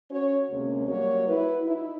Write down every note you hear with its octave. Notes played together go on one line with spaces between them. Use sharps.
C#4 F#4 C#5
D2 C3 G#3 A#3 C#4
F#3 G3 A#3 F#4 C#5
E4 F#4 B4
D#4 E4